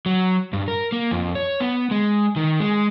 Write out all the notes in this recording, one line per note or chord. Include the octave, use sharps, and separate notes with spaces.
F#3
G2
A#4
A#3
F2
C#5
B3
G#3
D#3
G#3